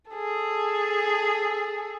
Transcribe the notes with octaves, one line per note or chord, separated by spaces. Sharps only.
G#4 A4